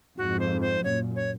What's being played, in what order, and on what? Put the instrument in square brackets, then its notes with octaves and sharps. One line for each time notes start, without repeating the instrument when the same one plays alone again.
[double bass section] F2 G#2 [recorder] F#4
[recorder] C5
C5
[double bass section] F#2 A#2 [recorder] C#5
[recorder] C#5